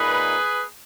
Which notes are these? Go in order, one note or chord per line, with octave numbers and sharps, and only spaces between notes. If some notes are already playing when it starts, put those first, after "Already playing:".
Already playing: A#2 A#3 D#4 G#4 B4